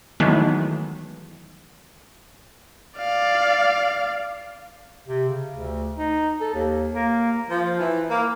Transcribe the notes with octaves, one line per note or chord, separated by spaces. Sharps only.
D#3 E3 F#3 G#3 A3 B3
D5 F5
C3
C#3
D2
D#4
A4
D#2
A#3
F3
E3
A#3